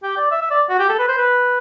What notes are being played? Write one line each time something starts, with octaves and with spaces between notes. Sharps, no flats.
G4
D5
E5
E5
D5
F#4
G4
A4
B4
C5
B4